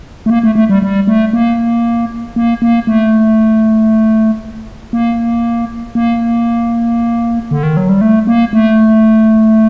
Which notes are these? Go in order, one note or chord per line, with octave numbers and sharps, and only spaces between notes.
A3
A#3
A3
A3
G3
G3
A3
A#3
A#3
A#3
A3
A#3
A#3
D3
D#3
F#3
G3
A3
A#3
A3